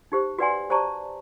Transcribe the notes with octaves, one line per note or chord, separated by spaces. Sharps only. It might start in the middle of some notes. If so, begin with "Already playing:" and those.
D#4 G4 C5
F#4 B4 D5 F#5 G#5 C6
G4 C5 D5 A5 A#5 C#6